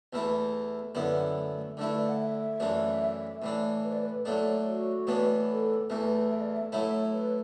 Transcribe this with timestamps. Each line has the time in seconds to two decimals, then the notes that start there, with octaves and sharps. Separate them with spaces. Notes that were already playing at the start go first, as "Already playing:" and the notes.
0.13 E2 E3 A3 E4
0.95 F#2 D3 B3 E4
1.36 A3
1.57 A3
1.77 D3 A3 D4 E4
1.87 B4
1.99 D5
2.08 F#5
2.19 E5
2.60 F#2 E3 A3 D4
3.42 A2 E3 D4
3.84 B4
3.92 D5
4.01 B4
4.25 A2 F#3 A3 D4 A4
4.66 F#4
5.07 A2 E3 B3 D4
5.49 A4
5.90 E2 E3 A3 B4
6.31 E5
6.41 D5
6.51 E5
6.72 A2 F#3 A3 E4 E5
7.13 B4